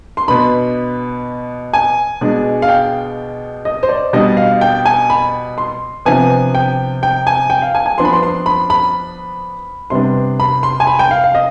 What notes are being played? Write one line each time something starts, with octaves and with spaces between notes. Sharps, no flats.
C6
B2 B3 D4 B5
G#5
B2 G#3 D4
F5
G5
D#5
C5
D5
B2 G3 D4 D#5
F5
G5
G#5
B5
C6
C3 F3 B3 D4 G#5
G5
G5
G#5
G5
F5
G#5
G#5
F3 B3 D4 C6
B5
C6
C6
B5
B5
C3 G3 B3 D4 C6
B5
C6
G#5
B5
G5
F5
F5
D#5